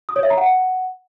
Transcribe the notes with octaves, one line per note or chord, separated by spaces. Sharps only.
D#6
C#5
E5
A#5
F#5